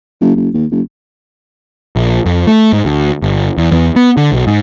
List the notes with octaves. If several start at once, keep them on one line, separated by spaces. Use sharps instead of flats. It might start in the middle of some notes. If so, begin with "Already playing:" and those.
F#1
F#1
D#2
F#1
A#1
F2
A3
G#2
D2
G1
E2
E2
B3
D3
B1
G#2